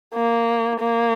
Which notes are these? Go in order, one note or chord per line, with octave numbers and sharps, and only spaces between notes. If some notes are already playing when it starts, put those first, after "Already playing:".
A#3
A#3